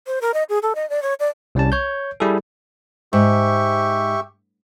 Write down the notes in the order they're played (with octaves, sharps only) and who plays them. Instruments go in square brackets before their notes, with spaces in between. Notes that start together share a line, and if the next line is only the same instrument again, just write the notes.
[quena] C5
A#4
D#5
G#4
A4
D#5
D5
C#5
D5
[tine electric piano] C2 G3 C#4 A5
C#5 G6
G3 E4 G#4 A4
[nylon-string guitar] G#2 [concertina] G4 E5 C#6